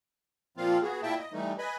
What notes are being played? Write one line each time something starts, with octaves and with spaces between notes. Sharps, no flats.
A#2 F3 A#3 C4 F4 F5
B3 F#4 G#4
A#2 A#3 E4 E5 G5 A5
D#5
E3 G3 A3 D#4
B4 D#5 G#5 B5